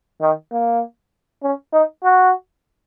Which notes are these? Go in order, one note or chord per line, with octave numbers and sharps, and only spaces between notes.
D#3
A#3
C#4
D#4
F#4